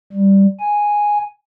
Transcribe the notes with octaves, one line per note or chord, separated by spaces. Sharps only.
G3
G#5